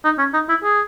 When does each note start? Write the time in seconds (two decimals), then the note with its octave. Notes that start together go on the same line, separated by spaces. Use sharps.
0.05 D#4
0.19 C#4
0.34 D#4
0.49 E4
0.63 G#4